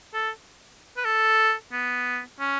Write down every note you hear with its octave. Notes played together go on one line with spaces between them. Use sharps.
A4
B4
A4
B3
C#4